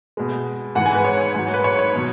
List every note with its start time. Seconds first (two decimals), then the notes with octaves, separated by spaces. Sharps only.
0.17 B2 G#3
0.75 G#2 E3 G#3 F#5
0.86 G#5
0.95 B4
1.05 C#5
1.35 G#2 F#3
1.54 B4
1.64 C#5
1.79 C#5
1.96 B2 F#3